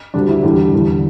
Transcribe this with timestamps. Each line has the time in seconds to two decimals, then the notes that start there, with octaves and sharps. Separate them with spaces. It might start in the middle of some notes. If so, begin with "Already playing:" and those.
0.14 D2 D3 G3 D4
0.28 E4
0.43 E2 D3 G3
0.73 E2 D3 G3